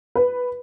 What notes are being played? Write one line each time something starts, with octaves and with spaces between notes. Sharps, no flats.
B4